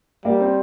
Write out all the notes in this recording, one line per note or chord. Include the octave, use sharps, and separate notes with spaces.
G3 A#3
C4